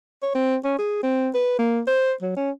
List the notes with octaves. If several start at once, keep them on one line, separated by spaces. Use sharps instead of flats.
C#5
C4
C#4
G#4
C4
B4
A#3
C5
F#3
C#4